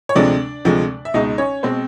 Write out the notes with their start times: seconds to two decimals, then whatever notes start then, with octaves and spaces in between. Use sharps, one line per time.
0.09 C#5
0.15 D2 C3 F3 G#3 D4 D5
0.65 D2 C3 F3 G#3
1.05 E5
1.14 C#2 B2 G#3 D#4 D#5
1.38 C#4 C#5
1.63 B2 G#3 C4 C5